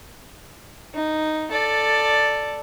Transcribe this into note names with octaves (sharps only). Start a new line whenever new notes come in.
D#4
A4 D5